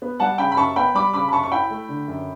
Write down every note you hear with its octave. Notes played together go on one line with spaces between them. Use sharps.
B3
G3 F#5 A5
C#3 G5 B5
B5
F#2 A5 C#6
B3 G5 B5
G3 B5 D6
C#3 B5 D6
B5
F#2 A5 C#6
C#6
E4 G5 B5
A3
D3
F#2